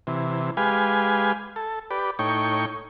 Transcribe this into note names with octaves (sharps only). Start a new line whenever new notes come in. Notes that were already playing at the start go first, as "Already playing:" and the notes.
C3 E3
G#3 G4 B4 F5 G#5
A4
G4 B4 D5
A2 D#4 C#5 G5 C#6